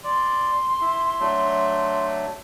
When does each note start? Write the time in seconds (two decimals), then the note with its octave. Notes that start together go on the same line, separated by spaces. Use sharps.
0.04 D5 C6
0.81 E4
1.20 F#3 A3 D4